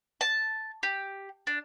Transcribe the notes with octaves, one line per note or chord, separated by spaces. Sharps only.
A5
G4
D4